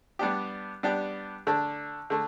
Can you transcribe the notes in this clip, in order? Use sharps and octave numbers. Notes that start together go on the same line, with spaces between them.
G3 B3 D4 G4
G3 B3 D4 G4
D3 A3 D4
D3 A3